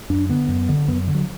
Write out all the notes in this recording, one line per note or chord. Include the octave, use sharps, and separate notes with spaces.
F#2 D4
D3 B3
F#2
D3
F#2 B3
D3
F#3